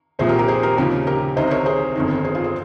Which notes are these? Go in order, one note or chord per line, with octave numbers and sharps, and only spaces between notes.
C2 A#2 F3 G#4 C5
G4 A#4
G4 A#4
G#4 C5
G4 A#4
D#2 C#3 F3 G4 A#4
G4 A#4
C2 C3 D#3 C5 D#5
A#4 C#5
G#4 C5
G1 F2 D#3
G#4 C5
F4 G#4
C4